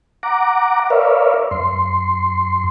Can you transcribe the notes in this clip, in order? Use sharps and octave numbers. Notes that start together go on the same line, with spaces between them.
F#5 A#5 D6
A#4 B4 C#5 D5 E5 F5
F#2 C6